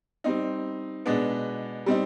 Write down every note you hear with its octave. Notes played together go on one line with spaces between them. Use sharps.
G3 C4 D#4
B2 G#3 B3 D4
G3 C4 D#4